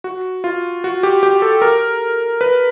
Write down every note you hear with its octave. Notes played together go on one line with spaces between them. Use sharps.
F#4
F4
F#4
G4
G4
A4
A#4
B4